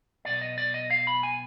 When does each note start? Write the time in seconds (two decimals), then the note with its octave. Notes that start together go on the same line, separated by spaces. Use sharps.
0.25 B1 B2 B3 D5
0.41 D#5
0.58 D5
0.74 D#5
0.90 F5
1.07 B5
1.23 G#5